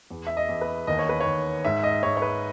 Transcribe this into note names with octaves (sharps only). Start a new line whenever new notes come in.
E2
E5
D#5
E2
B4
D#2 D#5
C#5
B4
D#2 C#5
G#2 E5
D#5
G#2 C#5
C#5
B4